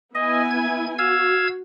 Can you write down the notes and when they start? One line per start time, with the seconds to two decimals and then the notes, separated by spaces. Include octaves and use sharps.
0.15 B3 E4 D#5 G#5
0.51 G#6
0.99 F#4 F5 E6 G#6